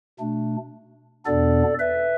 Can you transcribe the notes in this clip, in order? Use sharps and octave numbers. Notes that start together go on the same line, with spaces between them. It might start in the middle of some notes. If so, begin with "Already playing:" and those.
B2 A3 D4
E2 B2 B3 D4 A4 D5
B4 E5